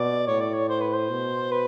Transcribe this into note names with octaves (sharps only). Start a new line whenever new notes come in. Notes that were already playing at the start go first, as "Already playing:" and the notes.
Already playing: B2 D5
A2 C#5
D5
C#5
C5
B4
C5
B2
B4